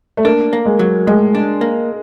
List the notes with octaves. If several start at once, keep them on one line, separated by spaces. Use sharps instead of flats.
A3
A#3 D4
A#3
G#3
F#3
A2 G#3
D4
A#3